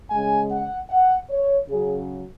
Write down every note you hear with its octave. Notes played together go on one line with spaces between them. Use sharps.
C#3 G#3 G#5
F#5
F#5
C#5
C#3 F#3 G#4